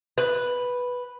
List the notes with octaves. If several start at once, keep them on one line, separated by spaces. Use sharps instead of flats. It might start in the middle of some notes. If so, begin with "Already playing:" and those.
B4